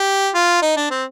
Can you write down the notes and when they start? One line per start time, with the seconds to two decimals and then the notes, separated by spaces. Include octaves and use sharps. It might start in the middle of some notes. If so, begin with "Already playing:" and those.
Already playing: G4
0.35 F4
0.63 D#4
0.77 D4
0.91 C4